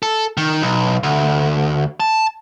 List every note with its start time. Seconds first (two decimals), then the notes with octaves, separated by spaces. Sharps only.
0.03 A4
0.37 D#3
0.62 B1
1.03 D2
2.00 A5